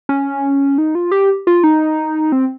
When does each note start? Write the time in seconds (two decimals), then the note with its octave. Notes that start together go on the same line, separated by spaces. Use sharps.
0.09 C#4
0.78 D#4
0.95 F4
1.11 G4
1.47 F4
1.64 D#4
2.32 C4